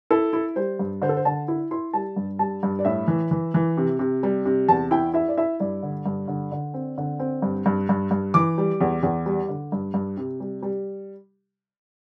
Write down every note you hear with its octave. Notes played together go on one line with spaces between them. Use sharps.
E4 A4
E4
G3 C5
G2
D3 C5
A4
C5
D3 A5
E4
E4 C6
G3 A5
G2
G3 A5
G2
D5
A2 E5
E3
E3
E3
C3
C3
G3
C3
E2 A5
E4 G5
E4 E5
D5
E4 E5
G2 D5
D3
G2
D3
D3
C4
D3
C4
G2
G2
G2
G2
E3 D6
G3
E2
E2
G3
D3
G2
G2
C3
G3
G3